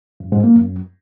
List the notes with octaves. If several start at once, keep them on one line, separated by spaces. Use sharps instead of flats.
F#2
G#2
A#3
F#2